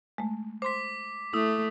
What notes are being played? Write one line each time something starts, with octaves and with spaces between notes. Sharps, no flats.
G#3 A3
C5 C6 D6 B6
A3 E4 D#6